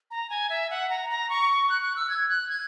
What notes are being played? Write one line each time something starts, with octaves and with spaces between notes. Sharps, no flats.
A#5
G#5
E5
F#5
A#5
A#5
C#6
F#6
F#6
E6
G#6
F#6
G#6